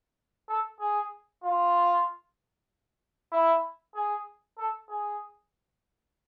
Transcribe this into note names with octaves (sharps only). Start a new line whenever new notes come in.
A4
G#4
F4
E4
G#4
A4
G#4